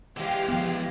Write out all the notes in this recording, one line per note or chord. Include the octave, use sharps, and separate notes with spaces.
E3 G#3 G4 F5
F3 B3